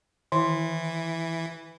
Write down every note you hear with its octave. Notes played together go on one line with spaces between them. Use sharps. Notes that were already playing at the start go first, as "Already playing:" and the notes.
D#3 E3 E4